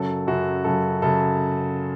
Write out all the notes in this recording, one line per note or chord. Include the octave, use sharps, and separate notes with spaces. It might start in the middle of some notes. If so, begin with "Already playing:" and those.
Already playing: F#2 C#3 F#3 A4
F#2 C#3 F#3 F#4
F#2 C#3 F#3 A4
F#2 C#3 F#3 A4